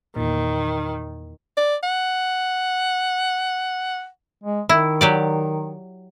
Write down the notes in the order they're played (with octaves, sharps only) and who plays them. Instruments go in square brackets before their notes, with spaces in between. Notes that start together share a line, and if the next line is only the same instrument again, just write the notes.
[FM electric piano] E2 A#2 [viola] D#3
[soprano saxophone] D5
F#5
[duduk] G#3
[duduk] D#3 [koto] E4
[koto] F#3 G4 D5